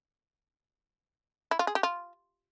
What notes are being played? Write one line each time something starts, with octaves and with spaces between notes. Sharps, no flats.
E4
F4
G#4
G4
F4